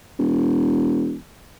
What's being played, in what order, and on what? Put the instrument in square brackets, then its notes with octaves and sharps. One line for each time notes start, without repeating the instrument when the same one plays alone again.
[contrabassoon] E1